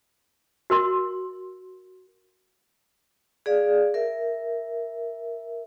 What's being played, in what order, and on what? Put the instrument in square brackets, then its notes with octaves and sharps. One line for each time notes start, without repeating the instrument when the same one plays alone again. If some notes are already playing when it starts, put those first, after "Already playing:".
[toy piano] F#4 A#4 C6
[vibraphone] G#4 D5 F5
A#4 E5